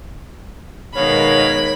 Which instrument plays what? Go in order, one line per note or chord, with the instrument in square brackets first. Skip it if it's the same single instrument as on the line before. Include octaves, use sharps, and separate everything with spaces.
[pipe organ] B2 F5 [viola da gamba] D#3 G#3 A#4 [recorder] C#5 [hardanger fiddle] B5